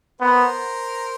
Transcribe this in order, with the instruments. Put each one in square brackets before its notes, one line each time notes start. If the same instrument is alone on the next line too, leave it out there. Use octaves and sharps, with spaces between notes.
[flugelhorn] B3 [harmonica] A#4 C5